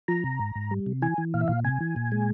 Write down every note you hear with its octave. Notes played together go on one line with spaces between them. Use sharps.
F3 A#5
C3
G#2
G#2
G3
C3
E3 G#5
E3
A#2 F5
E5
A#2 F5
C3 G#5
E3
A#2
G#3